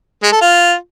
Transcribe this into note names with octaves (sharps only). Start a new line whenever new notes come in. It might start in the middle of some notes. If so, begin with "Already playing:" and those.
G#3
A4
F4